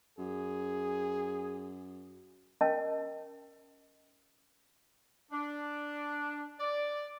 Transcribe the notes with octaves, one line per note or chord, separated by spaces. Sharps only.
F#2 G#4
C#4 A#4 D#5 A5
D4
D5